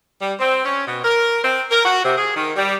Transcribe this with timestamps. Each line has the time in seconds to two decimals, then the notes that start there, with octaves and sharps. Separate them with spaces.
0.20 G3
0.40 C4
0.65 C#4
0.87 B2
1.04 A#4
1.44 C4
1.71 A#4
1.85 F#4
2.05 C3
2.18 G#4
2.36 D#3
2.56 G3